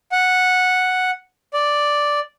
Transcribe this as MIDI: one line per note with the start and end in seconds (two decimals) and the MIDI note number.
0.12 1.11 78
1.54 2.20 74